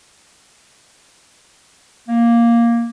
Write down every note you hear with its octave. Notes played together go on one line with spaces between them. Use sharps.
A#3